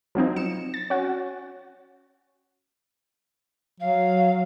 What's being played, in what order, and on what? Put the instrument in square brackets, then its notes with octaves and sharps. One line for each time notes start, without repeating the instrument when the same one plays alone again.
[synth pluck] F3 F#3 C4 D#4
C#7 E7
A6
C#4 F#4
[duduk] F#3 [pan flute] F5